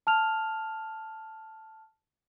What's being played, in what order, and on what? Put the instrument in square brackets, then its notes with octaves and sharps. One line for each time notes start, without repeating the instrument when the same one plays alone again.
[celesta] A5 F6 F7